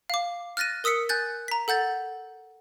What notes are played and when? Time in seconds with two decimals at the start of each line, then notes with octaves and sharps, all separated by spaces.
0.10 F5 D6
0.57 F6 F#6 A6 A#6 D#7
0.84 A#4 D#6 E6 B6 C#7
1.09 G#5 F#6 G6 A6
1.48 A#5 B6
1.68 A4 F#5 G6 A6